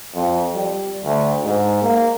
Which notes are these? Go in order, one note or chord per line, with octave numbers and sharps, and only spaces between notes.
F2
G3
D2
G#2
A#3